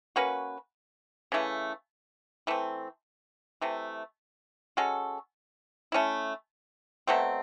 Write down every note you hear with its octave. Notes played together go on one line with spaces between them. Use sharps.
A#3 C#4 F#4 B4
C#3 E3 A3
E3 A3 C4
C3 E3 A3
G#3 C#4 F#4 A4
A3 C#4 E4
B2 F#3 A3 C4